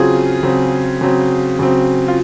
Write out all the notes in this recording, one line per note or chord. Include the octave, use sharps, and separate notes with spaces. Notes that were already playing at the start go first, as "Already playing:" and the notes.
Already playing: C#3 F#3 C4 F4 G#4
C#3 F#3 C4
C#3 F#3 C4
C#3 F#3 C4
F4